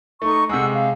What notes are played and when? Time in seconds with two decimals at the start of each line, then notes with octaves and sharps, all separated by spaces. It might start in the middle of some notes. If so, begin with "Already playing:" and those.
0.22 A3 D#4 C#6
0.49 C3 G#3 F#5 E6
0.72 F5